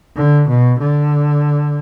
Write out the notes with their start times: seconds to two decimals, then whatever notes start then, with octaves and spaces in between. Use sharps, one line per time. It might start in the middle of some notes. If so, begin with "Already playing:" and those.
0.16 D3
0.48 B2
0.78 D3